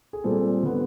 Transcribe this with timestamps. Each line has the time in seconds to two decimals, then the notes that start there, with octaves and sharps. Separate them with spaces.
0.13 G#4
0.24 A#2 G3 C4 A4
0.63 D3 G3 B3